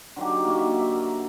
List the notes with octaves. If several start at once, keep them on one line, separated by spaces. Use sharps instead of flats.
D3 F#3 D#4 G4
A#3 F#4
E5
E5
A#4